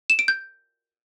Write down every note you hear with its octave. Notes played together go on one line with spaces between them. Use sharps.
E7
D7
G6